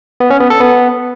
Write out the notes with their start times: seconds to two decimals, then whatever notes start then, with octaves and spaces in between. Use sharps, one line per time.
0.20 B3
0.30 C#4
0.40 B3
0.50 A4
0.60 B3